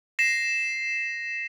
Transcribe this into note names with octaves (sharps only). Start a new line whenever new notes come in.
A#6 C7 E7